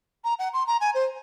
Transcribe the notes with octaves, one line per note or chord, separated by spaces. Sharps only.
A#5
F#5
C6
A#5
G#5
C5